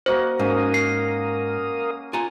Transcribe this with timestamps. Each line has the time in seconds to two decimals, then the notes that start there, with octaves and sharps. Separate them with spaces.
0.06 A#3 F#4 C5 D#5
0.39 G#2 C#4 A#4 F5 D#6
0.74 C7
2.13 F4 G#5 A#5